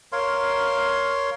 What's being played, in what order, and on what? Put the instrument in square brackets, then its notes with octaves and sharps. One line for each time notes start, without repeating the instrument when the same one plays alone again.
[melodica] A#4 C#5 F5 C6